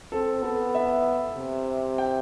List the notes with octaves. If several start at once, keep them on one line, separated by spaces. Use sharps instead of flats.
C4 A4
B3 A4
E5
C3
G5